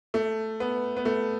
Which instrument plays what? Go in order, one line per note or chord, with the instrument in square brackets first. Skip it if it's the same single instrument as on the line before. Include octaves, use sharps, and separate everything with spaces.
[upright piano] A3
B3
B3
A3